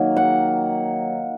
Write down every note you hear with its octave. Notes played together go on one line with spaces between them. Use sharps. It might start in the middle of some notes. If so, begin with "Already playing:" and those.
Already playing: D#3 F#3 A#3
F#5